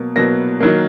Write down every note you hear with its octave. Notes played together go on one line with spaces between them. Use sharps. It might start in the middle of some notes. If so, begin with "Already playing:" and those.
Already playing: B2 F#3 A#3
B2 F#3 A#3 A#6
D#3 F#3 A#3